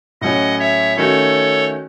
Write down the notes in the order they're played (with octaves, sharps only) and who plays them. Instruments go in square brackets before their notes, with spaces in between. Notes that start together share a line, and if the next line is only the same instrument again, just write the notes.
[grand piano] A2 F#3 C#4 [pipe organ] D#5 F#5
[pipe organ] C#5 E5
[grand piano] D#3 A3 C#4 F#4 [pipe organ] A4 C#5